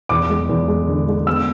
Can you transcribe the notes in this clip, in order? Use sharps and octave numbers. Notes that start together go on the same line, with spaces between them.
E2 D6
G#3
E2
G#3
D3
G#3
B3 E6